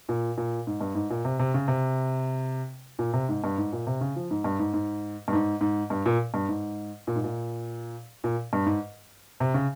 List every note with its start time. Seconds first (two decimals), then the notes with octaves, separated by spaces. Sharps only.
0.09 A#2
0.37 A#2
0.67 G#2
0.81 G2
0.95 G#2
1.10 A#2
1.25 C3
1.39 C3
1.54 C#3
1.68 C3
2.99 A#2
3.13 C3
3.29 G#2
3.44 G2
3.58 G#2
3.73 A#2
3.87 C3
4.01 C#3
4.16 F3
4.31 G#2
4.44 G2
4.59 G#2
4.74 G#2
5.28 G2
5.33 G#2
5.61 G#2
5.90 G2
6.06 A#2
6.34 G2
6.49 G#2
7.07 A#2
7.16 G#2
7.24 A#2
8.24 A#2
8.53 G2
8.66 G#2
9.40 C3
9.54 C#3